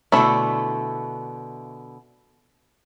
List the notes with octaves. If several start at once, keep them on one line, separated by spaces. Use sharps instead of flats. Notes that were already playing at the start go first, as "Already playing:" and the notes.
B2 D3 A3 E4